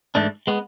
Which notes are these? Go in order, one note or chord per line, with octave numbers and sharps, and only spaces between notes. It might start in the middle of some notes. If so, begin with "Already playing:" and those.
G#2 E3 A3 D4
G#3 B3